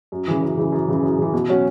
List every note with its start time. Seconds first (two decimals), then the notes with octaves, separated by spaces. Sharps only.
0.12 F#2
0.28 C#3 E3
0.42 F#2
0.57 C#3 E3
0.72 F#2
0.88 C#3 E3
1.03 F#2
1.18 C#3 E3
1.34 B2
1.49 F#3 C#4 F#4 C#5